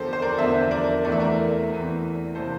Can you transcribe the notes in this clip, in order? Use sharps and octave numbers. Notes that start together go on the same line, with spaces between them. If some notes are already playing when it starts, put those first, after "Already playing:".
Already playing: E2 D3 F3 G4 A4 A#4 C5
C5
A#4 D5
E2 D3 F3 C5 E5
A#4 D5
E2 E3 A3 C4 D5
E5
A#4 D5
E2 E3 A3 C4
C3 E3 A#3 A4 C5